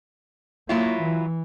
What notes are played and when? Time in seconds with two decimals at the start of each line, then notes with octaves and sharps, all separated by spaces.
0.69 F#3 A#3 E4 F4
1.03 E3